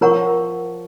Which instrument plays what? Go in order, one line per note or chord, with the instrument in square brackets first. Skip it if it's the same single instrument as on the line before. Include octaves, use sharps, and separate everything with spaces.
[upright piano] F3 [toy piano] A#4 C#5 F#5 A#5 C#6